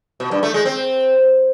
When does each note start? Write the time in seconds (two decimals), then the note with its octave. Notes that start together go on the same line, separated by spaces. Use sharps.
0.20 B2
0.31 G2
0.43 A3
0.54 G#3
0.65 C4